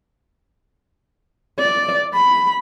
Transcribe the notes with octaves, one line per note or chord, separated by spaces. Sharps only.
D5
B5